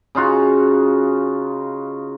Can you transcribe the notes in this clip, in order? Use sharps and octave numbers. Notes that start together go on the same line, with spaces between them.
C#3 D#4 F4 F#4